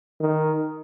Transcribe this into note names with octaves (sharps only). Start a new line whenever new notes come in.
D#3